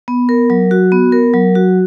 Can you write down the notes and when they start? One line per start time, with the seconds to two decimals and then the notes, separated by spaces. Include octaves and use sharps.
0.08 B3
0.29 A#4
0.50 F#3
0.71 F#4
0.92 B3
1.12 A#4
1.34 F#3
1.55 F#4